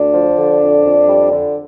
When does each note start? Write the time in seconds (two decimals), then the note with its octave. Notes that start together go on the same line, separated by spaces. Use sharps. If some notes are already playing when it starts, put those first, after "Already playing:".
Already playing: D2 D4
0.14 F3
0.37 D3
0.61 F2
0.85 F2
1.09 G3
1.32 D3